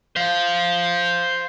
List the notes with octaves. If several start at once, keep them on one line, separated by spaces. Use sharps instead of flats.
C5 F5